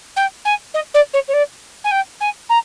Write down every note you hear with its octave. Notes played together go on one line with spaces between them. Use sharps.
G5
G#5
D#5
D5
C#5
C#5
D5
G#5
G5
G#5
A#5